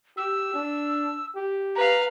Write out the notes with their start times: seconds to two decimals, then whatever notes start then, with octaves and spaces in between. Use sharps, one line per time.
0.17 G4 E6
0.54 D4
1.36 G4
1.76 B4 F5 A#5